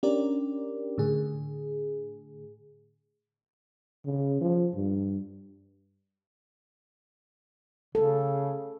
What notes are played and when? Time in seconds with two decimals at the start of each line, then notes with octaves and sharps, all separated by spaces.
0.03 C#4 D4 G4 A#4 D5
0.98 A2 D3 G#4
4.05 C#3
4.41 F3
4.75 G2
7.95 C#3 A4